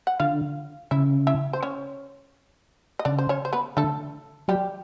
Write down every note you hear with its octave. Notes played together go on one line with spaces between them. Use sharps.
F#5
D3 F4 F5
C#3 E4 E5
E4 E5
C5
C#4 C#5
D#5
C#3 D4 D5
C5
C#4 C#5
C5
B3 B4
D3 A3 A4
F#3 G3 G4